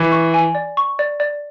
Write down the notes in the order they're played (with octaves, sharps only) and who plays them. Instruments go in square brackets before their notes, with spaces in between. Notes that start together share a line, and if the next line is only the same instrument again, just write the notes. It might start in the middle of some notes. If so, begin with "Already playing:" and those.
Already playing: [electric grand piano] E3
[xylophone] C#6
G#5
D5
C#6
D5
D5